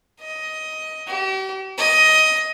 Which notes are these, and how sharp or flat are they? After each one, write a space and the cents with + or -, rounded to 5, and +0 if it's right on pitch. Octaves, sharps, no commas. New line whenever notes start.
D#5 +15
G4 -40
D#5 +15